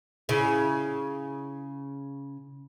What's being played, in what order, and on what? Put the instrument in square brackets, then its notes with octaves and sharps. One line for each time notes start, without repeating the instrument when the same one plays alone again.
[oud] C#3 E4